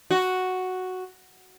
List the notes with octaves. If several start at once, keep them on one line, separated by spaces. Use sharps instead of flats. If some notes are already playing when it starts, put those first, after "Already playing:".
F#4